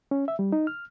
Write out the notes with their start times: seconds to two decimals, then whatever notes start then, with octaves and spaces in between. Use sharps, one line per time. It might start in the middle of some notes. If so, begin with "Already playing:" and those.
0.11 C#4
0.28 E5
0.39 G3
0.53 D#4
0.67 F6